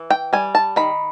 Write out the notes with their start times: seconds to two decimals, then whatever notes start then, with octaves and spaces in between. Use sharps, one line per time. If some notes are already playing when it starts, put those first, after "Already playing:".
Already playing: E3
0.10 G5
0.33 G3 G#5
0.55 A5
0.76 D#3 B5